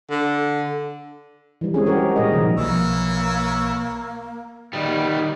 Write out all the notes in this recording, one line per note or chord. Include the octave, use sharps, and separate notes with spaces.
D3
E3 G3
G#3 C4 C#4 G#4
F#4 G4 A#4 C#5
G3
A#2 A#4 D#5
C3 D#3 F3
B1 E3 F3 A#3 C#5 E6
D#3 G3